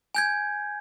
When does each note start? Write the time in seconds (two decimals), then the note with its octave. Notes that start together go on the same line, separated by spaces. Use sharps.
0.15 G#5 G6 G#6